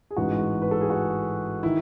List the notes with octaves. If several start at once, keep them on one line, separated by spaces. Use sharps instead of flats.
G#4
A1 G#2 E3 G#3 F#4
B4
A4
G#4
F#4
D#3 E4